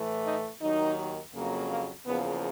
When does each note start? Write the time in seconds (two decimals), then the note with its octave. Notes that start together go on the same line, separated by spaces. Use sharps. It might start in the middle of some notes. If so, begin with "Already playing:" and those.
Already playing: A2 E3 A3
0.25 D#4
0.61 D#2 D#3 F#3 D#4
1.34 F2 C#3 F#3 A#3
1.70 A#3
2.05 E2 C#3 F3 A#3 B3